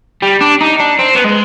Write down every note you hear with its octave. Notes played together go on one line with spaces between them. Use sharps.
G3
D4
D#4
D4
C4
B3
G#3